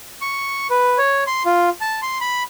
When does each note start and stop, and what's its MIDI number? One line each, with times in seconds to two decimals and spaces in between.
0.21 0.67 85
0.70 0.98 71
0.98 1.24 73
1.27 1.43 84
1.46 1.69 65
1.81 2.01 81
2.02 2.18 84
2.21 2.43 83